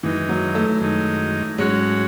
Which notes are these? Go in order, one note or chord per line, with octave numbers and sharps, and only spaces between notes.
F#2 D#3 E3 G#3 D#4
F#3
A3
F#2 D#3 G#3 D#4
G#2 F#3 G#3 C#4 F#4 C#5